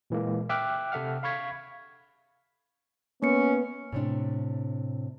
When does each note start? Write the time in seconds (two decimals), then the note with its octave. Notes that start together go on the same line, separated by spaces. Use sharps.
0.10 A#2 E3 G#3 A#3
0.49 E5 G5 D6 F6 F#6
0.92 C3 A4 E5 F#5 F6
1.23 F5 B5 C#6 G#6 B6
3.22 A#3 B3 C#4 C#7
3.93 A2 C3 D4